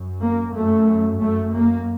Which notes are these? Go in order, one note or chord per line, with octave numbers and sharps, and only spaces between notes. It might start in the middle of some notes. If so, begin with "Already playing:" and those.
Already playing: F#2
A#3
F#2 A3
F#2 A3
A#3